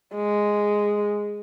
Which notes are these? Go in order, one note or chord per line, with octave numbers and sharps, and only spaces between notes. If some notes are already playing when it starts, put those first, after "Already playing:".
G#3